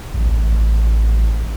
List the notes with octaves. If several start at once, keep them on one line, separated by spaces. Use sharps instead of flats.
A1